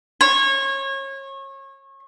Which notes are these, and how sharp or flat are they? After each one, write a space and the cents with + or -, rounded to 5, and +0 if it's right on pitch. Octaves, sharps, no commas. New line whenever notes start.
C#5 -30